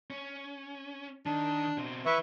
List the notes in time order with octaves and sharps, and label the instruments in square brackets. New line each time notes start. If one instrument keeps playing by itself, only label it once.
[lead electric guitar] C#4
[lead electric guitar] D#3 [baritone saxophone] D4
[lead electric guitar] B2 C4
[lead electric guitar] E3 [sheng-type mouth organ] B4 E5 C#6